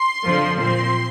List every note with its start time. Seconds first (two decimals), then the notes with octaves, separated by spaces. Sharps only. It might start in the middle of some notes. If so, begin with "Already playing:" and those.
Already playing: C6
0.25 F2 D3 F3
0.59 A#2 F3 C4 C6